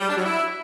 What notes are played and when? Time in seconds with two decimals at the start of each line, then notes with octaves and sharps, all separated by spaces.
0.01 G3
0.09 D4
0.17 F#3
0.26 E4